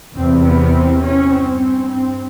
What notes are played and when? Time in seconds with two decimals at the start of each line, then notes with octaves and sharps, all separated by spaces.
0.16 E2 C3 C4
0.45 B3
0.74 C4
1.03 C#4
1.30 G2 C4
1.59 C4
1.87 C4